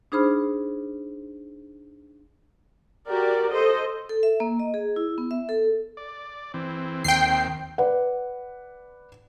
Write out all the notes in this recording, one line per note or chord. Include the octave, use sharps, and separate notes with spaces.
D4 D#4 G#4 C5 B5 F6
F#4 G4 A#4 D5
A4 C5 D#5
A4
E5
A#3
D#5
G#4
E4
B3
E5
A4
D5
E3 C4
D#2 D#3 C4 G5 C7
B4 D5 F#5